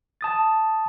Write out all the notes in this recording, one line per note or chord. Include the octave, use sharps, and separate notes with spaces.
A5 D#6 A6